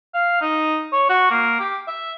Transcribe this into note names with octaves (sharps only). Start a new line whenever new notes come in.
F5
D#4
C#5
F#4
A#3
G4
E5